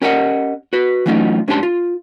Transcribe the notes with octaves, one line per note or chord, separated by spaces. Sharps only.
C#4 G4 A#4 D#5 E5 F#5
F#4 B4
E3 F#3 A3 C#4 D#4 F4
G#2 C#4 D4 G4 A5 C6
F4